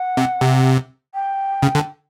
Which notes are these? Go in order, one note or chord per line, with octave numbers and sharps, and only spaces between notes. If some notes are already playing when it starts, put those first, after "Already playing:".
Already playing: F#5
C3
C3
G5
C#3
D3